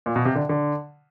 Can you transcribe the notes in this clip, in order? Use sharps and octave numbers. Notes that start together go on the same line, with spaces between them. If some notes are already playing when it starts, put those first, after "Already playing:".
A#2
B2
C3
D3
D3